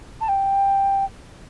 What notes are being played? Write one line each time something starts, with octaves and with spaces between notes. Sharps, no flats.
A5
G5